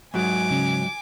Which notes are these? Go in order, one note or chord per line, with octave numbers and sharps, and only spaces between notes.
G#2 F#3 G#5 D6
C#3 C#4